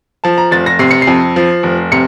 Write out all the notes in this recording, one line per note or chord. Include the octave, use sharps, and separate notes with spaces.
F3 A5
A#5
F1 A6
A#6
C3 C7
C#7
C7
F2
F3
F1
C3 C#7